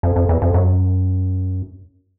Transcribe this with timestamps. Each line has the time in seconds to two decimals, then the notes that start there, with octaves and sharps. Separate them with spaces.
0.03 F2
0.16 F2
0.29 E2
0.42 F2
0.54 F#2